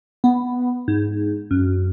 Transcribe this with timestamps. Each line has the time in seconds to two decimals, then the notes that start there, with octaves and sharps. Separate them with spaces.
0.24 B3
0.88 G#2
1.51 F#2